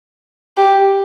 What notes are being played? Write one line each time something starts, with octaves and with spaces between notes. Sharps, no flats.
G4